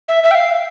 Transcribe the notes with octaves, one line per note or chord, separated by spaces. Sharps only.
E5
E5
G5
F5